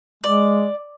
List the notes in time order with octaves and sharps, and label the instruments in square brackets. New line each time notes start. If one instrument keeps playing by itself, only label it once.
[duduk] G#3 [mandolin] D5